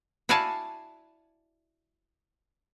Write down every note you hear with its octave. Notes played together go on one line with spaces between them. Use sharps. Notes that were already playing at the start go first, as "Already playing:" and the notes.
E4 F#4 D5 F5 G#5 A5